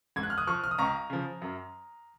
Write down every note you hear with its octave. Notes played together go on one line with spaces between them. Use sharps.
G#2 G#6
F#6
F6
D#6 F#6
F3 C#6 F6
F6
D#6
C#2 A#5 C#6
C#3 F3
F#2